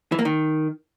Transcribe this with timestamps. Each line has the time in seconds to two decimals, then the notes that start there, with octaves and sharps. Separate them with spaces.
0.12 E3
0.19 A#3
0.25 D#3